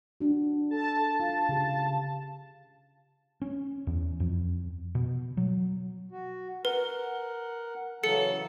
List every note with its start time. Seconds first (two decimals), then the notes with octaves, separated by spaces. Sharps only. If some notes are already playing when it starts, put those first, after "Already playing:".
0.21 D4 F#4
0.71 A4 A5
1.20 F4 F5
1.49 C#3 G4
3.42 C#4
3.87 E2
4.20 F2
4.95 B2
5.37 F#3
6.11 F#4
6.65 A#4 B4 F#5
8.04 C#3 E3 F#3 A4 C#7